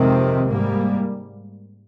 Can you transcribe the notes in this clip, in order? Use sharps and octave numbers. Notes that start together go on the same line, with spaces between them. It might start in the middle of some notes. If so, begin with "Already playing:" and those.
Already playing: F2 C3 D#3 G#3 C4
G#2 G3 A#3